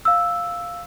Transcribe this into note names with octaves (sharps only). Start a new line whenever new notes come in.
F5 E6